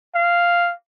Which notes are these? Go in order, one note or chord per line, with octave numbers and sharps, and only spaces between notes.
F5